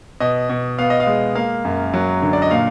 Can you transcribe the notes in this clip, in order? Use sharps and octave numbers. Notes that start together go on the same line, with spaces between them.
B2 D#5
B2
B3 F5
D#5
F5
G#3
A#3 F5
F#2
F#3
D3
D5
D#5
A#2 F5